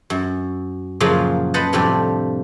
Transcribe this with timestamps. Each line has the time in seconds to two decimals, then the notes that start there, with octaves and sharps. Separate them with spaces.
0.10 F#2
1.00 F#2 A#2 C#3 F3 F#3
1.54 B4 C5 D#5 F#5 A5
1.73 F2 A2 C3 F3 G3 D4